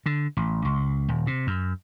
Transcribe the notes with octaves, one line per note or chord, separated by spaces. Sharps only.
D3
A1
C#2
D#1
C3
F#2